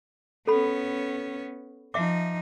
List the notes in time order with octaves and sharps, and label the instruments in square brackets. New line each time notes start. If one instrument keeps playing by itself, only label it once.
[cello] B3 C#4 [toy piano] A4 B5
[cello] F3 D#4 [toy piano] E5 D6